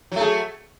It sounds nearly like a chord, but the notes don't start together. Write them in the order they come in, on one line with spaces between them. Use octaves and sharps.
F#3 A3 G#4